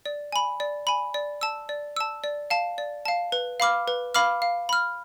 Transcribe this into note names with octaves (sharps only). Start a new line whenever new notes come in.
D5
G#5 B5
D5
G#5 B5
D5
A5 E6
D5
A5 E6
D5
F5 A5
D5
F5 A5
B4
F5 B5 D6 F6
B4
F5 B5 D6 F6
F5
B5 F6